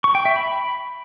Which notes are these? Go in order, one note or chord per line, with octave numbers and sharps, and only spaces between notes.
C#6
G5
E5
B5